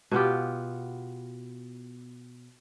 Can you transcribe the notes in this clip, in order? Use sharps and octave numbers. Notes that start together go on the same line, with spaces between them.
B2 B3 F4 G4